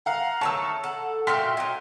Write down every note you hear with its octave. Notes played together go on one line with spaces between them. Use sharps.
F5 F#5 A#5
D#3 A3 C#5 A5 E6
A4 F#5
A#2 F#4 E5 G5 C6 F6 B6
F#3 D#4 G5